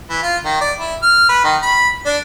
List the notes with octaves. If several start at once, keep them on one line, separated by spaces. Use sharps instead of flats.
E3
F4
D#3
D5
E4
F6
B4
D#3
B5
D4